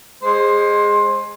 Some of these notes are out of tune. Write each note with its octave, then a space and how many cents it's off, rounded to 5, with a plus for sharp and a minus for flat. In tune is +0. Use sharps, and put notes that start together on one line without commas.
G#3 -10 C5 +15